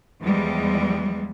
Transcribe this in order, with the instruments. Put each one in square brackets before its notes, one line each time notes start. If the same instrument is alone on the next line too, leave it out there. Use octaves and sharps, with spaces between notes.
[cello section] E2 F3 G3 G#3